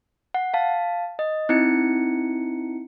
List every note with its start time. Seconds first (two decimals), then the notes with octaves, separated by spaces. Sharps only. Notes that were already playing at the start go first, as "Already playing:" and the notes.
0.34 F#5
0.54 F5 A5
1.19 D#5
1.49 C4 D#4 E4 C#7